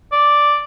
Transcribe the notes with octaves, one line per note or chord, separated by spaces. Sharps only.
D5